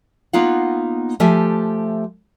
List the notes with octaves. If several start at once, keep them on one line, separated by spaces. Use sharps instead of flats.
A#3 B3 D#4 F4 F5 F#5
F3 A3 G4 E5 G#5